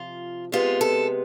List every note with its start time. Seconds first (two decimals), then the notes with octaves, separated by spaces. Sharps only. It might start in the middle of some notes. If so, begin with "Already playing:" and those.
Already playing: C3 F3 F4
0.52 C3 G#3 B3 F4
0.81 A4